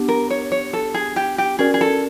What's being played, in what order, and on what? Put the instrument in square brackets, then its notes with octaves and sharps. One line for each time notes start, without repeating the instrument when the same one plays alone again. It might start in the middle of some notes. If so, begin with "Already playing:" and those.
Already playing: [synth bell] B3 D4 G4
[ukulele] A#4
C#5
C#5
A4
G#4
G4
G4
[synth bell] C#4 F#4 A#4 D5 [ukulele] G#4
[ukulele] G#4
A4